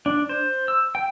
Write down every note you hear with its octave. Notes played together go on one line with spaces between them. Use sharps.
D4
C5
E6
G5